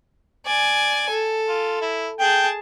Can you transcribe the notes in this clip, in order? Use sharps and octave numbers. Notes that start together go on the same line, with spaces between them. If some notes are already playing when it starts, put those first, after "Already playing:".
D5 G#5
A4
F4
E4
G#4 G5 A5